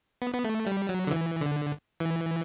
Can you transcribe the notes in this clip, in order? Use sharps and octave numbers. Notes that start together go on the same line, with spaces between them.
B3
B3
A3
G3
F#3
D3
E3
D3
E3